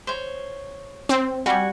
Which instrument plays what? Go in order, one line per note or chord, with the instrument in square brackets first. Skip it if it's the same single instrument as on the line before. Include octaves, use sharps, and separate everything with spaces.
[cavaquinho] C5 C#5
[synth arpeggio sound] C4
[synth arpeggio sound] G3 [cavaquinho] F#4 G#5